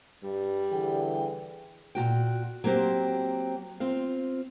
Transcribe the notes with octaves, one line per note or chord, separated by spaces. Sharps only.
G2 G3
D3 E3 G#4 G5
A#2 D#3 F#4 G5
F#3 A#3 C4 G4 C5
C4 F4 F5